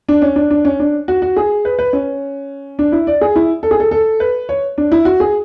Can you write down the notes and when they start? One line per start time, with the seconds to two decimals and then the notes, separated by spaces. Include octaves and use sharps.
0.09 D4
0.22 C#4
0.36 D4
0.51 D4
0.65 C#4
0.80 D4
1.08 F#4
1.22 F#4
1.37 G#4
1.65 B4
1.79 B4
1.93 C#4
2.79 D4
2.92 E4
3.07 D5
3.21 G#4
3.36 E4
3.63 A4
3.71 G#4
3.80 A4
3.91 A4
4.20 B4
4.49 C#5
4.78 D4
4.92 E4
5.05 F#4
5.20 G#4